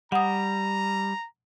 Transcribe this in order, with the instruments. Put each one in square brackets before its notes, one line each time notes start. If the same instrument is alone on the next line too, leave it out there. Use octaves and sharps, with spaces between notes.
[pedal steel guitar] G3 [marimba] F#5 D#6 [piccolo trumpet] A#5